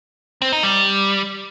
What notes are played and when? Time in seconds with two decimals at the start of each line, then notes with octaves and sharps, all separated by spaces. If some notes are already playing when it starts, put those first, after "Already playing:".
0.42 C4
0.52 D#4
0.63 G3